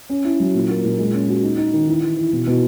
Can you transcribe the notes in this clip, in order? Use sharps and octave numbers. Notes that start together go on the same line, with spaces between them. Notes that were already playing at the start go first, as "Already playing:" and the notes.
C#4
E4
F#3
A#2
A#3
A#2
G#3
C#4
F#4
D#4
D#4
D#3
E3
E3
E3
B2
B2